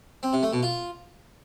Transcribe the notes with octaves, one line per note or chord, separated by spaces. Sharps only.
C4
C3
A3
B2
F4